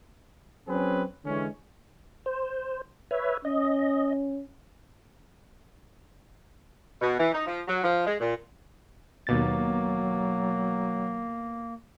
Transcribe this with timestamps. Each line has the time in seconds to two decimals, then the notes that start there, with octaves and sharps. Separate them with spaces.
0.68 F#3 C4 C#4 G#4 B4
1.25 D3 E3 G#3 C#4
2.26 C5
3.11 B4 C#5 E5
3.45 C#4 D#5
7.01 B2
7.18 E3
7.33 D#4
7.46 F3
7.67 F#3
7.83 F3
8.06 G#3
8.19 A#2
9.27 D#2 B2 F#3 A#3 A6